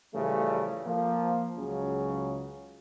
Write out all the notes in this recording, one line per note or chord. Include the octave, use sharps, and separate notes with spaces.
A1 C#3 E3 F3 G3 A3
F3 A#3 F4
C#2 C#3 F#3 C#4